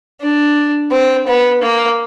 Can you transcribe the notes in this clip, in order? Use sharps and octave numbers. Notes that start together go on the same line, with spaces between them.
D4
C4
B3
A#3